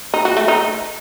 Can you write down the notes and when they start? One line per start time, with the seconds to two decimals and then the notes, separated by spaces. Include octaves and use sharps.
0.14 D#4
0.25 F#4
0.37 A3
0.48 D#4